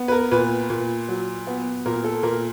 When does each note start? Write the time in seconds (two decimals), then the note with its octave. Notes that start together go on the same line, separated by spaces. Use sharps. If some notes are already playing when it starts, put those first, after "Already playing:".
Already playing: B3
0.08 B4
0.12 A#4
0.31 A#2 B4
0.70 A#2
1.09 F#3
1.47 B3
1.86 A#2 A#4
2.04 A4
2.23 A#2 A#4